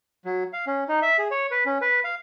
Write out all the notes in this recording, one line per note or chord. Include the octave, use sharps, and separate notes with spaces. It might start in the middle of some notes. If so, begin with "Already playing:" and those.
F#3
F5
C#4
D#4
E5
G#4
C#5
B4
C#4
B4
F5